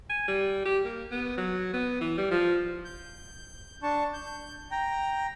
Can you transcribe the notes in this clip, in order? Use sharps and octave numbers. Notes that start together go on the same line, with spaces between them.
G#5
G3
G4
A#3
B3
F#3
B3
E3
G3
F3
G6
D4 A5 C#6
G6
G5 A#5